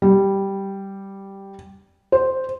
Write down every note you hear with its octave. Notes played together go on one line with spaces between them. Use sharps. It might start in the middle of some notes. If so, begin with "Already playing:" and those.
G3
C5